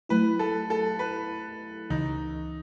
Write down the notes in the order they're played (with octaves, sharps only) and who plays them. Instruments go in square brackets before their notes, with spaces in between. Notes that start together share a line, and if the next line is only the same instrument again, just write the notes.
[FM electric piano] F#3 A3 E4 [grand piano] B4
[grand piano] A4
A4
B4
[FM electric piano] C#2 C#3 E3 [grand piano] D#4